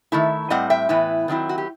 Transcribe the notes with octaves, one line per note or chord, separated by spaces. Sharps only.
D#3 A3 E4
A2 G3 C4 D#5 F#5
E5 G5
A2 E3 B3 E4
D#3 F#3 C4 E4
F#4
G4